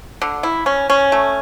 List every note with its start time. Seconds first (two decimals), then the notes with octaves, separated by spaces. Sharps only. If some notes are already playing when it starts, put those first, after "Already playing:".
0.22 D3
0.43 E4
0.66 C#4
0.90 C#4
1.12 A3